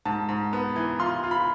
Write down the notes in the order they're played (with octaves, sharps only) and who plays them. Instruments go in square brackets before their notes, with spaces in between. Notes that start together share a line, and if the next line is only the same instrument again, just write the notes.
[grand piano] G#2 A5
G#2
B3
E3
F4 C6
F4
B5